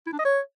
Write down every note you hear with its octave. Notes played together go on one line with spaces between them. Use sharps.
E4
D4
D#5
C#5